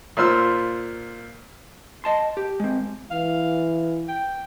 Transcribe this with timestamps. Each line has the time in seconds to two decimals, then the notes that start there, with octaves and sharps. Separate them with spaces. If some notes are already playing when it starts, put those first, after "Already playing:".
0.17 A#2 F4 C5 E6
2.04 D#5 A5 C6
2.37 G4
2.60 G#3 C4
3.11 E3 F5
4.09 G5